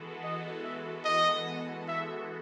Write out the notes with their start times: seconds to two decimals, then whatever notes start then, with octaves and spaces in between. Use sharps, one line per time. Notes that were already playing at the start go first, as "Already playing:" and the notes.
Already playing: E3 G#3 B3 F#4 A4
0.23 D#5
0.64 E5
1.05 D#5
1.88 E5